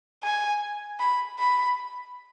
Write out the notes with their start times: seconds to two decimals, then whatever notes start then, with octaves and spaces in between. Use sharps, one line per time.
0.23 G#5
1.00 B5
1.39 B5